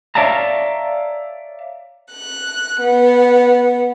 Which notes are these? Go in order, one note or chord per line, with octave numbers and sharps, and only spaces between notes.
C#5 D5 E5 F5 A5 A#5
F#6
B3